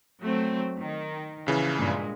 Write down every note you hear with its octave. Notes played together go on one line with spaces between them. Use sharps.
F#3 A3 C4
D#3
A#1 C#3 E3
G2 A#2 G#3